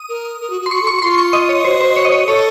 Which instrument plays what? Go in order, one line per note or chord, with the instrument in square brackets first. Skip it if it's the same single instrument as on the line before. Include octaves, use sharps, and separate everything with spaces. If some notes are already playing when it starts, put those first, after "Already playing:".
Already playing: [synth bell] D#6
[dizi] A#4
A#4
F#4
F#4
[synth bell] C6
[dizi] F#4 [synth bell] C#6
[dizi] A4 [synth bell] C#6
[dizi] F#4
[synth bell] C#6
[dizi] F4 [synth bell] C6
[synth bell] C#6
D#5
C#5
[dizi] F#4 [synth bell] C5
[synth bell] C5
C#5
D#5
C#5
[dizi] A4 [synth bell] C#5